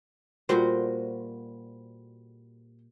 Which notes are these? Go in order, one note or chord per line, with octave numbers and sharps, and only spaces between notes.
A#2 G3 F#4 C5